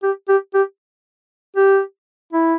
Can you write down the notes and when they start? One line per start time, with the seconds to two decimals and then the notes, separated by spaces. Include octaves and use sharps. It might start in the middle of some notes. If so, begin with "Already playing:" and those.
0.03 G4
0.29 G4
0.54 G4
1.56 G4
2.33 E4